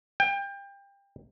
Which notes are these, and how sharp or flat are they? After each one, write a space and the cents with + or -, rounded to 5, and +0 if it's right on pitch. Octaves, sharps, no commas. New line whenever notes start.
G5 +25